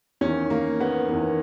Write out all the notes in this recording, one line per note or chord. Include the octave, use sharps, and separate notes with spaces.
E2 D#3 C#4
A#3
B3
E2 D#3 B3